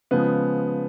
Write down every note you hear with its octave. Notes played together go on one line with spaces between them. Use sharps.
C#3 F3 G#3 B3